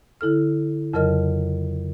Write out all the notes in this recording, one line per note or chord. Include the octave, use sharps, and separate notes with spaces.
D3 E4 A4 F6
F2 C#3 F#3 A#4 D#5 F6